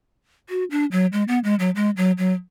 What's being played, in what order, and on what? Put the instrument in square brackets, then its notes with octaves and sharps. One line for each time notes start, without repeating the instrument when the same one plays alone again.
[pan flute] F#4
D4
F#3
G#3
B3
G#3
F#3
G#3
F#3
F#3